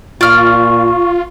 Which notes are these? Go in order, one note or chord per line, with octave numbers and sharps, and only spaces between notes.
A#2 F4 D5 C#6 F6